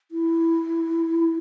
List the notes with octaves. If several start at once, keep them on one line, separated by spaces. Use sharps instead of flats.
E4